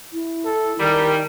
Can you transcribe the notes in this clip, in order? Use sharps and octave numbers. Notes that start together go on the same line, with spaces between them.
E4
A4
D#3 G3 A#4